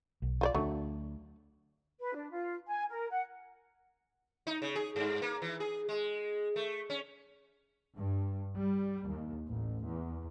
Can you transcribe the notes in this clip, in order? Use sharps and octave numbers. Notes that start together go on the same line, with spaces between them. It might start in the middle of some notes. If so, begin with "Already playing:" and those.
B1
F4 C5 D5
D2 F#3 A3 D4
B4
D4
F4
G#5
A#4
F#5
D#4
C#3
G#4
G2
A#3
E3
G#4
G#3
A3
C#4
G2
G3
D#2
A1
E2